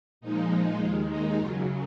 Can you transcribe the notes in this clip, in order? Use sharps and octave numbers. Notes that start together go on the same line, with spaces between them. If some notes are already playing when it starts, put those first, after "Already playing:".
A#2 F3 G#3 D#4
D#2 D#3 G#3 F4
D#4
F#2 C#3 F#3 F4